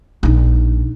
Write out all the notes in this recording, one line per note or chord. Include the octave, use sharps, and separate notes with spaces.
A#1 D#4